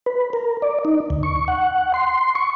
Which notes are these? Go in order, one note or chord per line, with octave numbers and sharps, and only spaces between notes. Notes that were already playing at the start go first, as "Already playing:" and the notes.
B4
A#4
D5
D#4
D2
C#6
F#5
C6
C#6